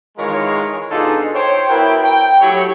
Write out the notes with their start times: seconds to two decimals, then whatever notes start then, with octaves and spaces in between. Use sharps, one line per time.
0.17 D#3 E3 G#3 F4 A#4 C#5
0.91 B2 D4 D#4 F4 G#4 A4
1.34 C5 C#5 G5
1.69 B3 E4 F#4 A#4 G5
2.04 G5
2.40 F#3 A3 E4 G4 C#5